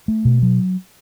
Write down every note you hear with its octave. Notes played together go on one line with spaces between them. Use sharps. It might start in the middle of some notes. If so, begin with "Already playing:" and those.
A3
B2
F#3